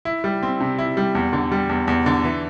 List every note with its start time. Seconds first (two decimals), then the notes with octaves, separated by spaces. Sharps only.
0.05 E4
0.24 G3
0.43 C4
0.60 C3
0.79 E4
0.97 G3
1.15 E2
1.33 D3
1.52 G3
1.69 E2
1.88 E2
2.06 D3
2.24 E3